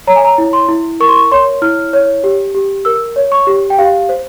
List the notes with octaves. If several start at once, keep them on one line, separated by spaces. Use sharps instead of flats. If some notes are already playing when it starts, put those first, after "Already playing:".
C#5 A#5
G#5
A#5
E4
C6
E4
A#4 C#6
C6
C#6
C#5 C6
E4 F6
C#5
G4
G4
A#4 E6
C#5
C#6
G4
G5
G4 F5
C5